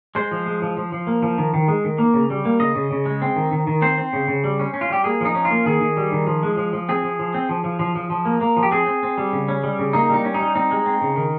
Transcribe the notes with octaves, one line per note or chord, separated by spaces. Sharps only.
G#3 C5
F3
G#3
F3
F3
F3
A#3
F3
D#3
D#3
G#3
D#3
A#3
C#3
G3
A#3
C#3 D#5
C#3
C#3
G#3
C4
D#3
D#3
D#3
C4 C5
C4
C#3
C#3
G3
C#4
C#4
F4
G3 G4
A#3 G#4
F3 D#4
C#4
F4
A#3
D#3 G#4
D#3
G3
D#3
F3
G#3
F3
F3
C4 G#4
F3
F3
C4
F3
F3
F3
F3
F3
A#3
A#3
F3
G4
C4 G#4
C4
C4
G3
C#3
C#4
G3
C#3
A#3 D#4
G3 D#4
C#4
D#4
G3
C4 D#4
G#3
C4
C#3
D#3